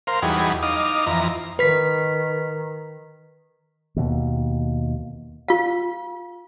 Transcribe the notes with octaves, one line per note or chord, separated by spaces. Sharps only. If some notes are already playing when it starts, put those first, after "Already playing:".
A#4 C5 F5
E2 F#3 G3 D#4 G#4 B5
D#4 D#5 F5 D6
F2 E3 A#5
D#3 B4 B6
D#2 B2
F4 F5